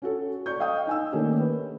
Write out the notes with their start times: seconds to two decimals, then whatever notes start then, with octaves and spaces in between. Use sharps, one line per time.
0.02 C#4 F#4 A4
0.46 D5 C#6 G6
0.60 D#5 F5 G5 D#6
0.87 D#4 G#5 E6
1.12 D#3 A3 A#3 C#4 D4 G4
1.40 B4